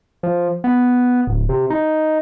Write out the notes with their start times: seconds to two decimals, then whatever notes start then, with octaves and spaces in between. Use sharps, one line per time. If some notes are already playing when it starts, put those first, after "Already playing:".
0.23 F3
0.64 B3
1.27 D1
1.49 C3
1.70 D#4